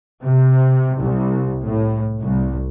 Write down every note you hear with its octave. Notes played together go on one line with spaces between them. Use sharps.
C3
C2
A2
C2